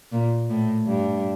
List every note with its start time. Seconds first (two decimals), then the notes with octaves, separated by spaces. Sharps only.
0.12 A#2
0.49 A2
0.87 G2